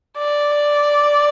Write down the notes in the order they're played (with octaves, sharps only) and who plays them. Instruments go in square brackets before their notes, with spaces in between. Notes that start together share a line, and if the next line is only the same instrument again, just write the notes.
[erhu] D5